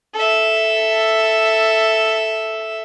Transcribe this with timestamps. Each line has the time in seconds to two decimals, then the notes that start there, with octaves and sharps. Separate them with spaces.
0.14 A4 E5